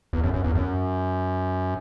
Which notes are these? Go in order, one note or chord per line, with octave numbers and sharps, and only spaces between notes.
E2
F#2
F#2
E2
F#2